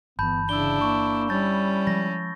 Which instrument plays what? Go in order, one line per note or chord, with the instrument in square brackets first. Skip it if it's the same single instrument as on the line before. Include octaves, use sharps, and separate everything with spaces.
[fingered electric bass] G1 E3 [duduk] B3 [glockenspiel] A5 B5 G6
[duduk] C#3 [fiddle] D4 E4 [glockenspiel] E6 G7
[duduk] A#3 [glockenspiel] C#6
[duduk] G3 [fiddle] C#4 E4 [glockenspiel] G6 A6
[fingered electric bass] F3 G#3 [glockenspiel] A#6